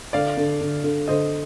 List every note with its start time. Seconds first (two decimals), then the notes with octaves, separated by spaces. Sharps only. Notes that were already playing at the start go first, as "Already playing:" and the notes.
0.13 D3 D5 F5
0.37 D3
0.61 D3
0.84 D3
1.08 D3 C5 D#5